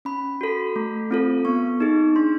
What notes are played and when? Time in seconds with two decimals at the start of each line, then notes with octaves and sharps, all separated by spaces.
0.05 C#4 B5
0.41 F#4 A4
0.76 A3
1.11 C4 F4 A4
1.45 B3 C#6
1.80 D#4 G#4
2.16 D4 C6